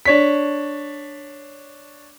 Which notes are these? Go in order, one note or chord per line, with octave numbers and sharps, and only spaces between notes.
D4 C#5 B6